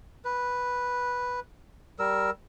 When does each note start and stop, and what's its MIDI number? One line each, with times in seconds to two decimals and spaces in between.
0.25 1.40 71
1.99 2.30 55
1.99 2.30 70
1.99 2.30 88